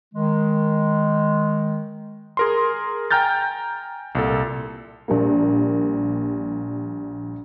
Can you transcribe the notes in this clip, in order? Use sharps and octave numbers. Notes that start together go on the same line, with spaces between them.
D#3 G#3
G#4 A#4 C6
G5 G#5 A#5 F6 G6 A6
C2 A#2 A4
A#1 G3 A#3